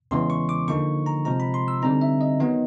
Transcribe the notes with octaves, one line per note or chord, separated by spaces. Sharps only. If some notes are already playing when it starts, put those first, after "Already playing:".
E2 C#3 E3 G#3 C#4 C6
C#6
D6
D3 F3 A#3 D#4 C#6
A#5
C3 F3 G#3 A#5
B5
C6
E6
D3 G3 C4 D#4 A#5
E5
D#5
D#3 F#3 B3 D#4